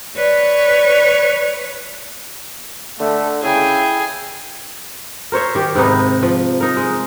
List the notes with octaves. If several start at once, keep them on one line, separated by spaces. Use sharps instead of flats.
B4 C#5 D5
D3 A3
C#3 E4 G#4 G5
A#4 C5 C#5 E5
D#3 G4
G#2 C3 B3 D#4
F3
D#4 A#4
G#3